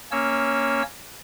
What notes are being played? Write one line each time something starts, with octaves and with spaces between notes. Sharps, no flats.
A#3 C#4 C#5 E6